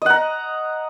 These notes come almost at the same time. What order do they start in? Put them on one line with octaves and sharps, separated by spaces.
D#5 F#5 A#5